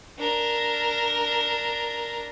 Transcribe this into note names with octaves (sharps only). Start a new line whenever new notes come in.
D4 A#4